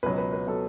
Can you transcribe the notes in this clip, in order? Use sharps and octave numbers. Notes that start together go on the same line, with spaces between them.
C#2 B2 F#3 B4
B4
B4
B2 F#3 A4